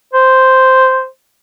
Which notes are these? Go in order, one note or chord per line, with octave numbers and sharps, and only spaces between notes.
C5